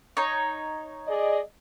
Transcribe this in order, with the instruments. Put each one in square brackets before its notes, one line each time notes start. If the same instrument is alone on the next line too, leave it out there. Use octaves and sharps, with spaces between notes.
[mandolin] D#4 C#5
[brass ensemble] G#4 D5 D#5